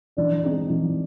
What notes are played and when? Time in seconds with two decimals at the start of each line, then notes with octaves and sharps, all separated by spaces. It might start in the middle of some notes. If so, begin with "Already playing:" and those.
0.17 E3 D4 D5
0.43 G#3 C4 D#4
0.70 E3